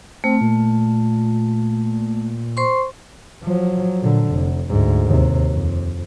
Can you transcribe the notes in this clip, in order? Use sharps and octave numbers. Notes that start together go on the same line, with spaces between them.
A3 C4
A#2
C5 C6 C#6
F3 F#3
A#2 D3
F1
D2 G#2
D#2 C3
F2